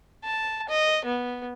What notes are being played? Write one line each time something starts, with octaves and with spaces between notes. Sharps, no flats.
A5
D#5
B3